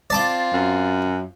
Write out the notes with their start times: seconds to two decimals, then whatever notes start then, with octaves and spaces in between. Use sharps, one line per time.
0.10 C4 F4 D5 A5 D6
0.53 F#2